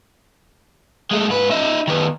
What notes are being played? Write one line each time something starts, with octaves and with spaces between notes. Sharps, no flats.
G#3 A3
G#2 B4
D#4 E5
D#3 B3